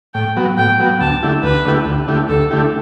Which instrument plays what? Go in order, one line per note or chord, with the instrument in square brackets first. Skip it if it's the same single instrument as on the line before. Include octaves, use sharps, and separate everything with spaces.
[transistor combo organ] A2 [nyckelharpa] G5
[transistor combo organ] F#3 B3 F#4
[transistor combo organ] A2 [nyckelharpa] G5
[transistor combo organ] F#3 B3 F#4
[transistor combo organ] D2 [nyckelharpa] A5
[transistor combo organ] D3 A3 E4 G4
[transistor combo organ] D2 [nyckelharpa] B4
[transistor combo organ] D3 A3 E4 G4
D2
D3 A3 E4 G4
[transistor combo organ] D2 [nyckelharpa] A4
[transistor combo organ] D3 A3 E4 G4